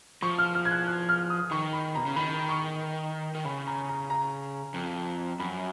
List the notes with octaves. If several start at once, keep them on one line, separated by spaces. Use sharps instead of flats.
F3 C#6
F6
F6
G#6
F#6
F#6
F6
D#6
D#3 C#6
B5
B2 A#5
C#3
D#3 B5
C#6
D#3
C#3 B5
A#5
A#5
A#5
F2
F#2 B5